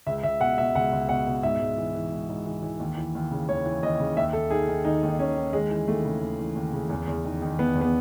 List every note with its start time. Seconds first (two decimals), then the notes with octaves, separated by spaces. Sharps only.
0.06 C#2 E5
0.23 C#2 E5
0.40 B2 F#5
0.58 B2 E5
0.75 C#2 F#5
0.93 C#2
1.09 B2 F#5
1.27 B2
1.43 G#2 E5
1.60 G#2
1.78 E3
1.94 E3
2.12 G#2
2.29 G#2
2.46 E3
2.62 E3
2.79 D#2
2.97 E3
3.15 D#2
3.31 C#3
3.49 D#2 C#5
3.66 E3
3.83 D#2 D#5
4.00 C#3
4.16 D#2 E5
4.33 D#2 A4
4.50 D#3 G#4
4.68 D#3
4.85 D#2 D#4
5.03 D#2
5.08 D#4
5.19 D#3 C#4
5.37 D#3
5.53 D#2 G#3
5.70 E3
5.88 D#2 A3
6.05 C#3
6.21 D#2
6.39 E3
6.55 D#2
6.73 C#3
6.90 E2
7.07 E2
7.25 D#3
7.42 D#3
7.58 E2 B3
7.75 E2
7.81 B3